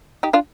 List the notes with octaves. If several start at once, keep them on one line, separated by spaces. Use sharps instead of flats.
D#4 G4
D4 F4